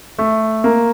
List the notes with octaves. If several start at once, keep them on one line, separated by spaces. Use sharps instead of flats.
A3
A#3